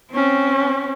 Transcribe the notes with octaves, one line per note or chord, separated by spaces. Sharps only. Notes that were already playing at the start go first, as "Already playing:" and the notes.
C4 C#4